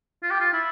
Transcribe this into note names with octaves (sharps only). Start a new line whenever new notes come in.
F4
G4
F4
E4